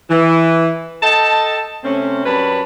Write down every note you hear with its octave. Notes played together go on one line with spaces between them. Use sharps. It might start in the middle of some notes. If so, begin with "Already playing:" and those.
E3
A4 D#5 G5 A5
C3 A3 C4 C#4
F#2 G3 B4 C#5 A5 B5